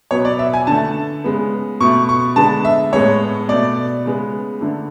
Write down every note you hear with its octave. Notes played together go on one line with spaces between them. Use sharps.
B2 F#3 B3 C#5
D5
E5
G#5
D3 A3 A5
C#3 G#3 B3
B2 A3 C#6
C#6
D3 G#3 B3 A5
E5
A2 G#3 B3 C#5
B2 A3 D5
C#3 G#3 B3
D3 A3